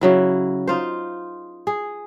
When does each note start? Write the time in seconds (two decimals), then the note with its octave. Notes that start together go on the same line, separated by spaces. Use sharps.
0.01 C#3 F#3 E4
0.67 D#4 F4 C5
1.67 G#4